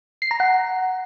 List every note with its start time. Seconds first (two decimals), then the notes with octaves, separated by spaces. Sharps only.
0.22 C7
0.31 A#5
0.40 F#5